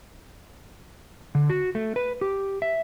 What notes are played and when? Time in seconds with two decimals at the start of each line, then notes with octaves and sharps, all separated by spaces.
1.35 D3
1.50 F#4
1.75 A3
1.96 B4
2.21 G4
2.62 E5